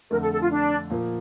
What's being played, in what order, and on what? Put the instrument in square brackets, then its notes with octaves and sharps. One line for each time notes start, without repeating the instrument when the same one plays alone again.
[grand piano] F2 D3 A3 [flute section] A#4
[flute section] A4
A4
F4
D4
[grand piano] A#2 F3 A#3